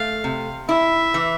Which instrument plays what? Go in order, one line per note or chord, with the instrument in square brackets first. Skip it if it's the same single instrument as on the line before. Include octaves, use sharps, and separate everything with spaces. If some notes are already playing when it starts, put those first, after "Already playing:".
Already playing: [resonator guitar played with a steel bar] A3 [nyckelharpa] F5
[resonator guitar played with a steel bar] C3
[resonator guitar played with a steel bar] E4 [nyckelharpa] E5
[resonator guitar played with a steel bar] E3